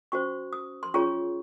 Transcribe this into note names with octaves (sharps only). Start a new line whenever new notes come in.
C#4 F#4 C5 C#6
D#6
C6
C#4 F4 G#4 C#5 C#6